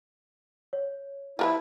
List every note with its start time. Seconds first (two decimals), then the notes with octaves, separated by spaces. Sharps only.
0.73 C#5
1.39 F3 E4 A#4 B4 A5